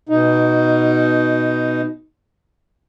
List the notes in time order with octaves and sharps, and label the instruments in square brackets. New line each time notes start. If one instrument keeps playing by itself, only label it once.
[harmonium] B2 D#4